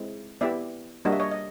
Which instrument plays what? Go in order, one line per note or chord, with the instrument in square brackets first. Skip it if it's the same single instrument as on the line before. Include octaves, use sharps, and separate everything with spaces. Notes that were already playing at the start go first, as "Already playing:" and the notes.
Already playing: [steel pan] G#3 C4 E4
B3 E4 G4 D5 E5
G3 A#3 D4 F#4 D#5
E5
C#5 D#5
D#5